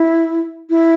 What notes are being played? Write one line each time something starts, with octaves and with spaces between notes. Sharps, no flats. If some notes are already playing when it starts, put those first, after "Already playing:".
Already playing: E4
E4